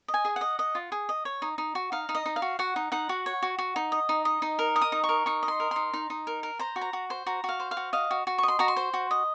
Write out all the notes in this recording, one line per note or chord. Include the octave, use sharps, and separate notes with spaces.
D#5
G#5
G#4
D#5 F#5
D#5
F4
G#4
D#5
C#5
D#4
D#4
F#4
D#4 F5
D#4
D#5
D#4
F5
F#4
F#4 F#5
D#4
D#4 F#5
F#4
C#5
F#4
F#4
D#4
D#5
D#4
D#5
D#4
A#4
D#5
D#6
D#4
C#6
A#4
D#4 C#6
D#5
C6
A#4
D#4 C6
D#4
D#4
A#4
A#4
C5 A#5
F#4
A#5
F#4
C5
F#4 A#5
F#4 F5
C5
F5
F#4
D#5 F5
F#4
F#4
C#6
D#5 C6
F#4 A#5
C6
C5
F#4
D#5